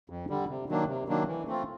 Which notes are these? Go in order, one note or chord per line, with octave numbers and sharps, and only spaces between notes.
F2
D3 G3
C3
D#3 F#3 A#3 D4
C3
D#3 F#3 A#3 D4
E3
A3 C4 F4